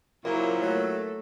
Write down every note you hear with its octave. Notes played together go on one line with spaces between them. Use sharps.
F#2 A#2 C#3 F#3 A#3 E4 C5
F#3 A3 A4